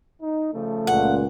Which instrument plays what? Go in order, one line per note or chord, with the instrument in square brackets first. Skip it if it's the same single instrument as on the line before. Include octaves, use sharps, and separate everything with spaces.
[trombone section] D#4
C#3 F3 A3
[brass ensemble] C#2 A#2 [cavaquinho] F#5